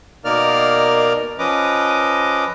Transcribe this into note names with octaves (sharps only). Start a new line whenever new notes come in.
B2 A#3 D#4 A#4 D5 F6
F3 C#4 B4 D#5 D6